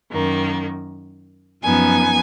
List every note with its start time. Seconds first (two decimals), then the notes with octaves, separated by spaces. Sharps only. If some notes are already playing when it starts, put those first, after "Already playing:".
0.11 F#2 D#3 A#3
1.63 F#2 F3 B3 D#4 G#5